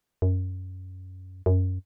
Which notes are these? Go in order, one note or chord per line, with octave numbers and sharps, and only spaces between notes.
F#2
F#2